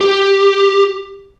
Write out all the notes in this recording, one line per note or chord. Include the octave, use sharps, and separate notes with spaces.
G4